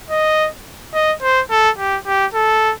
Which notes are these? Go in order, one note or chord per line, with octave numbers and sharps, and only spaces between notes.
D#5
D#5
C5
A4
G4
G4
A4